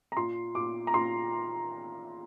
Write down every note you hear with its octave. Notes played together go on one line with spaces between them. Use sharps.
A#5
A#2 C6
A#2 D6
A#5
A#2 C6